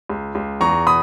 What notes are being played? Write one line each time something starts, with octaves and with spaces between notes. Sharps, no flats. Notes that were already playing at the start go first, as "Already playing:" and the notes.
C#2
C#2
E2 A#5 C#6
B2 B5 D#6